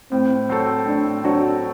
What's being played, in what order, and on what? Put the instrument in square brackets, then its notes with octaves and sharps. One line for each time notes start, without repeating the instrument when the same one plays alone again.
[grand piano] A2 [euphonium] C4
[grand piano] F#3 C4 F#4 A4
[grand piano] A2 [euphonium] D4
[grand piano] F#3 C4 F#4 A4 [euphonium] D4